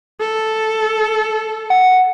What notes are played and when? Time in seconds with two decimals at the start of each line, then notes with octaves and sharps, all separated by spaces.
0.20 A4
1.70 F#5